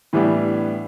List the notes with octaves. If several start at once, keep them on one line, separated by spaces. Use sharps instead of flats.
A2 E3 G3 B3 D4